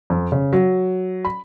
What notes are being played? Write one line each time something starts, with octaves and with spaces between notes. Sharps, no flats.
F2
C#3
F#3
B5